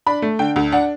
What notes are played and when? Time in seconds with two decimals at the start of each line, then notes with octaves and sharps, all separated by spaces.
0.07 D4 B5
0.22 A3
0.39 D3 G5
0.56 D2
0.72 D4 F#5